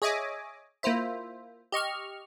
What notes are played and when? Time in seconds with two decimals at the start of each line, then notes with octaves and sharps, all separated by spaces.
0.02 G#4 C#5 D#5 E5 G#5 D6
0.83 A#3 E4 F4 C5 E5
1.72 G4 D#5 C#6 F6